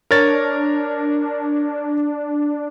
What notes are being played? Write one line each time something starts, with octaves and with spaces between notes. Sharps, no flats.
D4 A#4 C#5 A6